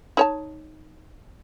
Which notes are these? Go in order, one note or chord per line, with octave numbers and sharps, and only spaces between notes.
D#4 C#5 A5